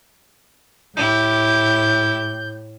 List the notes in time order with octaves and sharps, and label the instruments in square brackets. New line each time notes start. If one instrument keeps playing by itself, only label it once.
[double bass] A2 [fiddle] E4 G4 [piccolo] G6